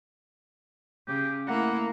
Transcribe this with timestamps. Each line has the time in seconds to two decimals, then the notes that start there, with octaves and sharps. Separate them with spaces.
1.08 C#3 G4
1.47 A3 A#3 E4 F#5